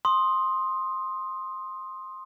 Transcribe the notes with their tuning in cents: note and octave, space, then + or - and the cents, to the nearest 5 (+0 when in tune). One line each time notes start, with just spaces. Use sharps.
C6 +10 D#6 +0